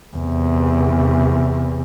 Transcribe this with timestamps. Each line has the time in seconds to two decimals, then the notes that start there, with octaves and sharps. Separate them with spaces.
0.16 E2 C3